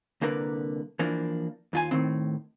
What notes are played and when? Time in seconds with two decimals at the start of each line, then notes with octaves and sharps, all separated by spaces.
0.21 C2 D3 A#3 A#4 B4
0.99 E3 F3 A#3 D4
1.73 D#2 F4 G#5
1.91 A2 D#3 C4